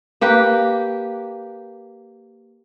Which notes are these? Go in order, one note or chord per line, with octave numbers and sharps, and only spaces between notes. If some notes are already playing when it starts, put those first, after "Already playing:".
A#3 G4 B4